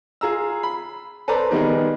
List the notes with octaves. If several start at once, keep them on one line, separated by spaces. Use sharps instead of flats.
F4 G#4 A#5 E6
B5
A4 B4 C5 D5 A#5
D#3 G3 B3 D#4 G#4